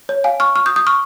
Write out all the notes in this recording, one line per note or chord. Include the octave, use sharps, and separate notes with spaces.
C#5
F5 G#5
C#6 F6
C#6 F6
D#6 G6
D#6 G6
C#6 F6